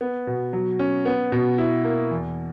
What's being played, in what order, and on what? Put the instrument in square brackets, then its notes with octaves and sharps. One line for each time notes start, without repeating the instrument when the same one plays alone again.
[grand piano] B3
B2
F#3
C#4
B3
B2
E4
A#3
E2